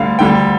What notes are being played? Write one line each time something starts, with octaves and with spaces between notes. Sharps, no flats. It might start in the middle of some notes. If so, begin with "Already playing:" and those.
Already playing: D2 D3 G3 F5
D2 D3 G3 G5